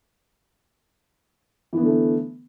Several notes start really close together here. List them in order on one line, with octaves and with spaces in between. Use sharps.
E3 B3 D3 A3